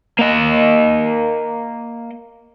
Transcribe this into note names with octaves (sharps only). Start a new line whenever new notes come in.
A#3 D#5